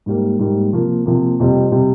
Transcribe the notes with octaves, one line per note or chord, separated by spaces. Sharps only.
G#2 G3 A#3
G#2 G3 A#3
C3 F3 A#3
C3 F3 A#3
F2 C3 G3
C3 G3